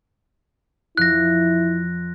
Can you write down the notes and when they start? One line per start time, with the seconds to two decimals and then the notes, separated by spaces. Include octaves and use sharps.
0.97 F2 F3 E4 F4 F#6 A#6